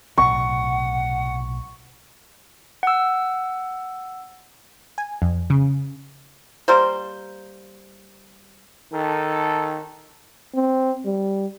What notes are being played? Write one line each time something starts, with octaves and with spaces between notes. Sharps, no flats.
B1 A2 C3 F#5 C#6
F#5 E6
G#5
F2
C#3
G3 A#3 C5
D#3 A4
C4
G3